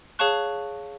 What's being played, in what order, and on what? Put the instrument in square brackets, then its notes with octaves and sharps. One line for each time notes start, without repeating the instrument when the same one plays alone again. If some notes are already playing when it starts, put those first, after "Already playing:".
[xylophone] G#4 C#5 F5 A5 C#6 F#6